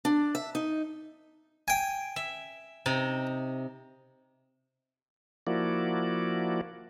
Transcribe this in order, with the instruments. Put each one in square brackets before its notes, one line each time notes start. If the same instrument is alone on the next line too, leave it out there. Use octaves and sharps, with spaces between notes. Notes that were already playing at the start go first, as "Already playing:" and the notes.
[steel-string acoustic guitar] D4
E5
D#4
[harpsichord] G5 G#5
[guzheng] E5
C3 D#4
[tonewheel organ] F3 A#3 E4 F#4 D5